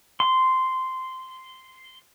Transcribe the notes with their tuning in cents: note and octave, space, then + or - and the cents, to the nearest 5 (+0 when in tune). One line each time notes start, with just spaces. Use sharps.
C6 -10